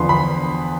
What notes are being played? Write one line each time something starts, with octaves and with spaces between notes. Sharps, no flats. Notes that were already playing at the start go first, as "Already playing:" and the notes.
Already playing: E2 D3 F3 B3 C6
B5